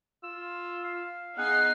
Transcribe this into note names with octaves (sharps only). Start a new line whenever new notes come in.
F4 E6
F5
B3 D#4 G#4 F#5 C7